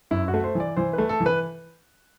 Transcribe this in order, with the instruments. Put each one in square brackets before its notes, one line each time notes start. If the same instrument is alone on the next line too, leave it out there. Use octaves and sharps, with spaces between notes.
[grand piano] F#2 [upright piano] E4
[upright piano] F#4
[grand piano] A3
[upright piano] C5
[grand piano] E3 [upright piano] D5
[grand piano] E3 [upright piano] C5
[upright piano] B4
[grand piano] A3
[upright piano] A4
[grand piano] E3
[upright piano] B4